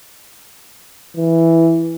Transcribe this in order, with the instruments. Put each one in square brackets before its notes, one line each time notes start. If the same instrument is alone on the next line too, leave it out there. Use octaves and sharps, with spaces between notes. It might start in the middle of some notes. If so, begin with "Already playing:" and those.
[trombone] E3